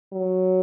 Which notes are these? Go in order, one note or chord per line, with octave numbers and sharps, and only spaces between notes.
F#3